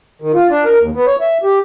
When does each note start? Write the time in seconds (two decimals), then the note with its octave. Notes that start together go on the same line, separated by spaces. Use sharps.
0.22 D#3
0.34 F4
0.50 D4
0.65 A#4
0.79 D#2
0.95 B3
1.07 C#5
1.21 E5
1.43 G4